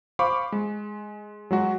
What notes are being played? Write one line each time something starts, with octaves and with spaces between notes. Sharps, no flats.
C5 F5 B5 C#6 D6
G#3
F#3 G#3 F#4